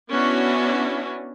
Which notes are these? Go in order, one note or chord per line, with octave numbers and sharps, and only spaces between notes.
B3 C#4 D4 E4 F#4